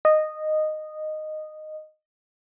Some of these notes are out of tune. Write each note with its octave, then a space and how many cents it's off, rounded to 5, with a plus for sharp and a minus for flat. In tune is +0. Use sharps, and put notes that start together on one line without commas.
D#5 -10